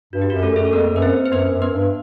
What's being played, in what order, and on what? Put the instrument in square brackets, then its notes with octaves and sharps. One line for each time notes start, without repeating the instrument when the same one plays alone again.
[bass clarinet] G2 [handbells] F#4
[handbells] G4
[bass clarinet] F#2 [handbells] F#4
[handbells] A3 A4
[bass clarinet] F#2 [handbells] G#4
[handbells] A4
[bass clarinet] F2 [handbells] A#3 A#4
[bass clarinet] F#2 [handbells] B4
[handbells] C4 C5
C5
[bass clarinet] F#2 [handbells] B3 B4
[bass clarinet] F#2
[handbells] B3 B4
[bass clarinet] G2